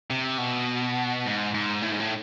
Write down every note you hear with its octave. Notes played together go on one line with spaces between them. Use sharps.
C3
B2
G#2
G#2
A2
G#2
A2